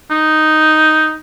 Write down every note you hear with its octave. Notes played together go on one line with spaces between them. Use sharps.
D#4